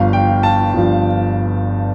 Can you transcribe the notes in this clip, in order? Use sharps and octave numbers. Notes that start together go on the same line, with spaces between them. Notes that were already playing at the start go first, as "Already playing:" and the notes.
Already playing: G1 G2 F3 F5
G5
A5
G1 G2 F3